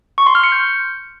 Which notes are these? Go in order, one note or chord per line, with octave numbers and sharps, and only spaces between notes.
C#6
C6
F6
C#7
G6